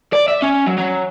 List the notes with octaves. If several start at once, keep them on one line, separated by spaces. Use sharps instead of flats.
D5
E5
C#4
F#3
F#3